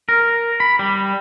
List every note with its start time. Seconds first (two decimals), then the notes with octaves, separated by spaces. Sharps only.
0.09 A#4
0.60 B5
0.79 G3